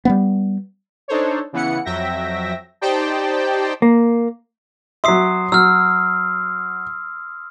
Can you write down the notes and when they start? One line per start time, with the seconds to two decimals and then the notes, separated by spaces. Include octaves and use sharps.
0.05 G3 A3 B3
1.08 D4 D#4 A4 C5 C#5
1.53 C#3 E3 B3 F#5 C#7
1.85 F2 F#3 E5 G5 A#6
2.81 D#4 G4 C5 D5 G5 A5
3.82 A#3
5.04 F#3 E5 C6 D#6 C7
5.52 F#3 E6 F6